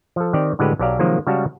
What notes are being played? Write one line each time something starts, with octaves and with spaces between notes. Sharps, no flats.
F3 A4
D#3 C4 G4 D5
A2 D3 G#3 F#4 G4 B4
B1 F#3 G4 D5 F5 A#5
C3 D#3 F3 F#3 G#3 A#3
C#3 G3 G#3 F#4 F5 A5